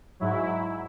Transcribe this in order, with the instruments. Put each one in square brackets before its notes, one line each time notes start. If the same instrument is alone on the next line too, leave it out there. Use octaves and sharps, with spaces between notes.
[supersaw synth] G#2 F#3 E4